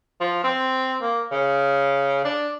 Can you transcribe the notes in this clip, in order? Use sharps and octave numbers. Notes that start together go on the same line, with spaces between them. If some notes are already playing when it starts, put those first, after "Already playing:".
F3
C4
A#3
C#3
D4